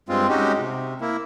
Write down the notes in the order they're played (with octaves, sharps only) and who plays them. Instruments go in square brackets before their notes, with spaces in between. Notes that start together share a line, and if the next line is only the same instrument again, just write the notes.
[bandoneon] G2 G#3 C4 F4
G#3 C#4 D#4 F#4 G4
C3
A#3 E4